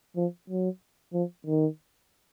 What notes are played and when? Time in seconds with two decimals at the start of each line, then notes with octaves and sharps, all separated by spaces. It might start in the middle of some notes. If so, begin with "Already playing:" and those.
0.16 F3
0.50 F#3
1.13 F3
1.47 D#3